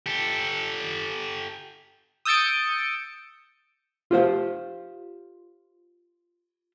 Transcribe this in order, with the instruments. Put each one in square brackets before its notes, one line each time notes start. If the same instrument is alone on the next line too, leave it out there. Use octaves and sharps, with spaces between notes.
[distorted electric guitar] G4 A4
[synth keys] D#6 E6 G6 A6 C#7 D7
[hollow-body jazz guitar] F4 G4 C5 F5